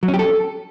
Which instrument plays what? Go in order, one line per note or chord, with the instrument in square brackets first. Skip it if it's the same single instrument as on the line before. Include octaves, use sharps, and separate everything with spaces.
[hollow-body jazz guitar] F#3
C#4
G4
A4